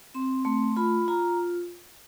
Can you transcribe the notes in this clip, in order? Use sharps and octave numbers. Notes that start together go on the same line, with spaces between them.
C4 C6
A3 C6
F4 B5
F4 A#5